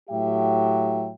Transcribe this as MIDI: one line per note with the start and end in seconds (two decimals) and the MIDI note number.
0.10 1.10 45
0.10 1.10 54
0.10 1.10 67
0.10 1.10 76
0.10 1.10 79